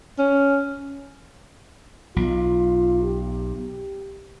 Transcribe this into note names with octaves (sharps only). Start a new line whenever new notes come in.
C#4
B1 F4
G4